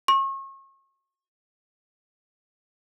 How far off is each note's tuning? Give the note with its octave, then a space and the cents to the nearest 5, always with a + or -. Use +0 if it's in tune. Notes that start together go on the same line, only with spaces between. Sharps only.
C#6 -35